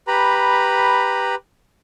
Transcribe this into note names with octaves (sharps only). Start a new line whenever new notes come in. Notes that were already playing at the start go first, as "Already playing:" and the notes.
G4 B4 A#5 B5